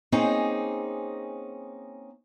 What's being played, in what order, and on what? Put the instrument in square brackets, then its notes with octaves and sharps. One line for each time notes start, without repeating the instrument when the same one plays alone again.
[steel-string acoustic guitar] A#3 C4 C#4 D#4 G#4